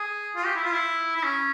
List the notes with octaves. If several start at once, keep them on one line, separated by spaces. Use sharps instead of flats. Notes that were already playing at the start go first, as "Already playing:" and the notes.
Already playing: G#4
F4
G4
E4
F4
E4
E4
C#4